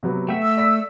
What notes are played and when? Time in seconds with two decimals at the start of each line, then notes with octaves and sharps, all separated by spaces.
0.03 C3 F#3 B3
0.29 A3 E5 F#5 G5
0.43 E6
0.57 D5 B6